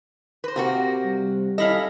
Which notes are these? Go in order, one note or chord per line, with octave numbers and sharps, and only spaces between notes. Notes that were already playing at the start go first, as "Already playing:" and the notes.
B4 C5 A#6
C3 A#3 C4 F#4
G3
C#4 E4 A4 D#5 F5 B5 A#6